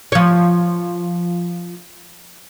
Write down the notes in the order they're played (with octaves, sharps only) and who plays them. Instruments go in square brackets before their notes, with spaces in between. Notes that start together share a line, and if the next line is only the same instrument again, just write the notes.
[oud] F3 C#5